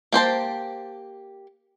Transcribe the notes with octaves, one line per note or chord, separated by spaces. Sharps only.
A#3 G4 C5 A5